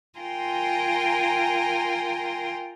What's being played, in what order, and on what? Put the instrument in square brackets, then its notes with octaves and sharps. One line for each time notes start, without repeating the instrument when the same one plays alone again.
[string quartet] F4 A#4 G5 G#5 A#5 C6